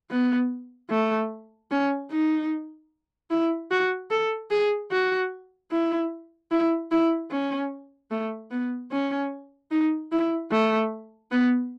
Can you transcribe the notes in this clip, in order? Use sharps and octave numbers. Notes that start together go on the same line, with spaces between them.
B3
A3
C#4
D#4
E4
F#4
A4
G#4
F#4
E4
E4
E4
C#4
A3
B3
C#4
D#4
E4
A3
B3